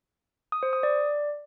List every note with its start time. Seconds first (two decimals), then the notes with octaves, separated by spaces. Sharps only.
0.52 D#6
0.63 C5
0.73 D#6
0.83 D5